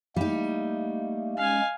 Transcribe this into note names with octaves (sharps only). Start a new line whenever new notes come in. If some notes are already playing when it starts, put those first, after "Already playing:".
G3 A3 A#3 D#4
G#3 C#4 F5 G#5